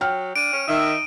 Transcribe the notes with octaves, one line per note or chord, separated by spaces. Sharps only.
F#3 G5 F6
D4 D7 D#7
C#4
D#3 D#4 E5